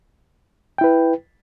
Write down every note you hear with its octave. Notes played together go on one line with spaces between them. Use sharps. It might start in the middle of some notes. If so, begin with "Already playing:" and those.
E4 B4 G5